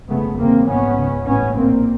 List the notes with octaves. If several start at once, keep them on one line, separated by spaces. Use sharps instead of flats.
G1 F2 C#3 A3 B3
F#1 E2 C#3 A#3 C4
A#1 G#2 B3 C#4
C#2 C#3
A1 G2 B3 C#4
A#1 A#2 A#3 C4